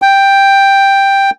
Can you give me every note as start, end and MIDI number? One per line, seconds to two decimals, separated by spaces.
0.02 1.30 79